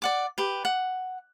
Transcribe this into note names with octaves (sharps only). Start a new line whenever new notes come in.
D5 F#5 D6
G4 B4
F#5